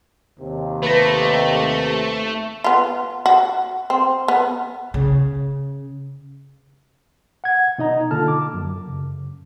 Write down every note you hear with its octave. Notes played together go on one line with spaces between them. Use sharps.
D#2 C3
A3 B4 A#6
B3 F4
F#4
C4
B3
C#3
F#5 G#6
B2 D#4 D#5 A#5
D3 A#3 F4 A4 A5 F6
D6
F#2
F#2 C#3